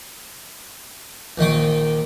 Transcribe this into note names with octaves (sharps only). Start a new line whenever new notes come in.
A#1 D#3 D#4 D6